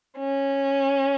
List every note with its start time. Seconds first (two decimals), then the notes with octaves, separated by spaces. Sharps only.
0.18 C#4